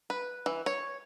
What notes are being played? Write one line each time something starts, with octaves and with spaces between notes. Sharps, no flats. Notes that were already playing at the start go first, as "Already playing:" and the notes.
B4
E3
C#5